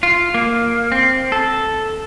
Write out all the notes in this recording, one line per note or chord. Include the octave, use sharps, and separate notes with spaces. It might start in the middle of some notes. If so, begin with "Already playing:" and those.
F4
A#3
C4
A4